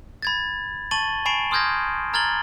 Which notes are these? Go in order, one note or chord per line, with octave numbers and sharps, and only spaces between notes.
B5 G#6 A6
A5 C#6 A6 D#7 F#7 G7
G#5 B5 C#6 C7 D7 E7
C6 D#6 F6 G6 G#6 A#6
A#5 F6 G#6 A6 F#7 G7